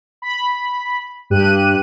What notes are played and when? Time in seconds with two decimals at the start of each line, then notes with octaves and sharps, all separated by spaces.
0.22 B5
1.30 G2 G4 F#6 D#7